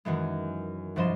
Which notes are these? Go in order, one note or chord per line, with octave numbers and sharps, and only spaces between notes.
F#2 D#3 E3 G#3
C2 G2 F3 D#5 C6 E7